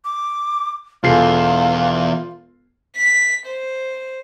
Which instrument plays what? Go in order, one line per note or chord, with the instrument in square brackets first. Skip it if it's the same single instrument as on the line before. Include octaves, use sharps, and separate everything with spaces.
[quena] D6
[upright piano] E1 G#4 A4 [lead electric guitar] E2 [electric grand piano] F4 C7 [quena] F5
[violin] B6
C5